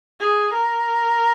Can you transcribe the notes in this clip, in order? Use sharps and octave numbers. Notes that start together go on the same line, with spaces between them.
G#4
A#4